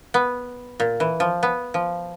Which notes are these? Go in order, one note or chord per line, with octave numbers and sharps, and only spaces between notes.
B3
A#2
E3
F3
B3
F3